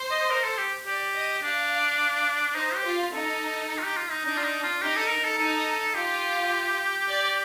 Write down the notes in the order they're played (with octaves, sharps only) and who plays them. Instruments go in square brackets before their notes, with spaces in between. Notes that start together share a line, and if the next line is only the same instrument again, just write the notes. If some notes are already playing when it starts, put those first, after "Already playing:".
Already playing: [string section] C5
[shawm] D#5
A#4
A4
G4
[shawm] G4 [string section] D5
[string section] D#5
[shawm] D4 [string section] F5
[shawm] D#4 [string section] C5
[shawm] G4
[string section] F4
[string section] D#4 [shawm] A4
[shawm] A4
F4
G4
F4
D#4
[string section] D4 [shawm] D#4
[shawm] F4
D#4
F4
[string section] D#4 [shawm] G4
[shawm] A4
A#4
A4
[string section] D#4 [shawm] A4
[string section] F4 [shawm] G4
[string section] D5